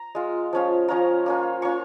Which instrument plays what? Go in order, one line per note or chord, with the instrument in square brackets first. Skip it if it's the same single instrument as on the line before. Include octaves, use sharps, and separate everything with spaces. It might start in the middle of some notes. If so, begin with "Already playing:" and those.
Already playing: [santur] A#5
G#3 F4
F3 C#4 F4
F3 C#4 F4 A#5
A#3 C#4 F4
A#3 C#4 F4 C#6